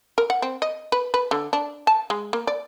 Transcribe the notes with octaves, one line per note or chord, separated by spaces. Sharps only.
A#4
F#5
C4
D#5
B4
B4
D3
D4
A5
G#3
A#3
D5